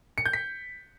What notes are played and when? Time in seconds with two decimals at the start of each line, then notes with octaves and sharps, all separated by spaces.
0.18 C#7
0.26 G6
0.33 B6